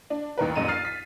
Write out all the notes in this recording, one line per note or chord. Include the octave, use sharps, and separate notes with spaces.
D4
A1 D#2 A#4 B4
A#1 F#2 D#5 D#7
F6 A6 C7
B6